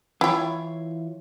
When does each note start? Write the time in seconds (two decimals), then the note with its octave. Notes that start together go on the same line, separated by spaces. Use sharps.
0.21 E3 E4 F4 C#5 G5